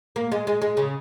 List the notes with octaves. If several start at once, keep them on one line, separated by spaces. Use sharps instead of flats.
A#3
G#3
G#3
G#3
C#3